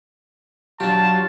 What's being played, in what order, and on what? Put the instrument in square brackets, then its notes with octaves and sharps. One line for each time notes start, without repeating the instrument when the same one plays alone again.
[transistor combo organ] F#3 F4 [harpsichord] D4 G4 [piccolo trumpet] A5